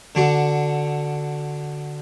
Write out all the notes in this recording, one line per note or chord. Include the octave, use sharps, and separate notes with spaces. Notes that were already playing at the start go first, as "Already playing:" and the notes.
D3 D4 F#4